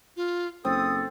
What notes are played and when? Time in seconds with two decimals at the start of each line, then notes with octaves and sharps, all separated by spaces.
0.17 F4
0.65 F#1 C4 A4 D#6